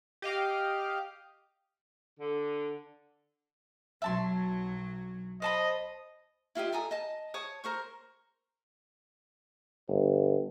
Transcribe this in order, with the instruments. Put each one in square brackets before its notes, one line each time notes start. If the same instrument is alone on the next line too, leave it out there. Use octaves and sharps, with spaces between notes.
[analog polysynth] G4 D#5 F5 D6
[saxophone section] D3
[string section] B1 F#3 [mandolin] E5 A5 C6
[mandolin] C5 A5 B5 [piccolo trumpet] D#5
[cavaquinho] E4 F4 G4 D#5
A4 G#5 A#5 D#6
D#5 A5
C#5 A5 D#6
A#4 C5 C#6
[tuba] G1